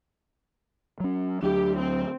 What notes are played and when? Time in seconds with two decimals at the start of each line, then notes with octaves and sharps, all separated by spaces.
1.00 F#3 C#4
1.42 D2 F#3 D4 G4
1.77 C4